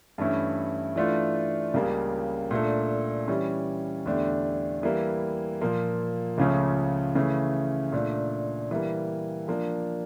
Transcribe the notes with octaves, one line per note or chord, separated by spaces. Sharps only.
G2 E3 A3 C#4 E4
E3 A3 D4 F4
C#2 C#3 G3 A#3
A#2 A3 D4 A4
E3 G3 C#4
E2 D3 A3 D4 G4
E3 G3 A#3 E4
A#2 F3 A#3
C#2 C#3 F3 A3 C#4
C#3 E3 A3
A#2 A3 D4
E3 G3 A#3
F3 A#3 D4